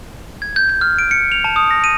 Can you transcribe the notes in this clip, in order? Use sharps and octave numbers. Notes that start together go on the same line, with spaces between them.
G#6
G6
G6
F6
D7
C#7
F7
A5
D#6
A#6
D#7